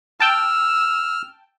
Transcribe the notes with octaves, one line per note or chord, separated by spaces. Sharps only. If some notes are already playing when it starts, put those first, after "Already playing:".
G5 A5 E6 F6